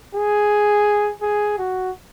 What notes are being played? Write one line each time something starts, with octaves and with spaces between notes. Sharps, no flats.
G#4
G#4
F#4